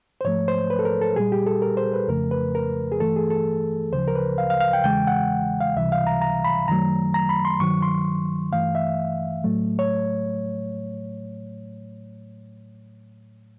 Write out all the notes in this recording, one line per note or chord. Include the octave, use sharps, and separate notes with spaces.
C5
G#2 F3 A3 C#5
C5
B4
A4
A#4
A4
A#2 G3 G#4
G4
A4
A#4
C5
B4
F2 C#3 F3 A3 A#4
B4
A#4
G#4
G2 E3 A3 A4
G#4
A4
D2 C#3 F3 C5
A#4
B4
F5
F5
F5
G5
E2 C#3 E3 G#3 G5
F#5
F5
C#2 C3 E3 G3 E5
F5
A#5
A#5
B5
F#2 D#3 F#3 A3 A#5
A#5
B5
C6
G2 D#3 F#3 C#6
C6
G2 E3 A3 F5
E5
A2 F#3 A3
C#5